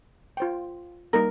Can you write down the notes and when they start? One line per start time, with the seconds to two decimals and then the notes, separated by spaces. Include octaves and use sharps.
0.37 F4 C5 G5
1.13 G3 A#3 D#4 A#4